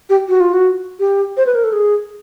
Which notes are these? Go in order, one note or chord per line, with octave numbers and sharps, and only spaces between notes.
G4
F#4
F4
F#4
G4
C5
B4
A#4
A4
G#4